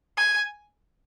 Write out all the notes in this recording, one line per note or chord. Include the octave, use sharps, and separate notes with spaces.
G#5